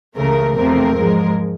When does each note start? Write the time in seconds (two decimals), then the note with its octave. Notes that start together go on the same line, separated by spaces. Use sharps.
0.16 C#2 C#3 E3 A3 A#4
0.56 E2 C3 F3 A3 C4 A#4
0.96 G#2 F3 G#3